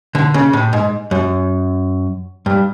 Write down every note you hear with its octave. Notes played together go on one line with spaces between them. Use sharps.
D3
C#3
A2
G#2
F#2
G2